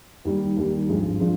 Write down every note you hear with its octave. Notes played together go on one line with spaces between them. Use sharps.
D#2 D#3 G3
D#2 D#3 G3
G#1 G2 F3 G#3 D4
F3 G#3 D4